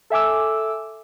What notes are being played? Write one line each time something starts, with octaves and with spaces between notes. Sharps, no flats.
A4 E5 G#5 D6 E6